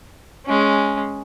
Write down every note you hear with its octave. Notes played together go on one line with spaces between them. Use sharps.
G#3 C#4